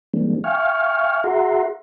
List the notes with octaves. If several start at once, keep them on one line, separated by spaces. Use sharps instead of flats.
E3 G3 G#3 A#3 C4 D4
E5 F5 G5 G#5 C#6 F6
F#4 G#4 E5 F#5 A#5 C6